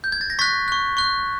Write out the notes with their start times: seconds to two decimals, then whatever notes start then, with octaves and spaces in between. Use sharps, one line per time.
0.04 G6
0.12 G#6
0.21 A6
0.30 A#6
0.39 C#6 F#6 A6 B6
0.68 C#6 F#6
0.97 C#6 F#6